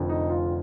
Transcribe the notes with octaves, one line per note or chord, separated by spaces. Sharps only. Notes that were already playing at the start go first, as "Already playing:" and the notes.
Already playing: F1 F2 D3 F3
D#4
F4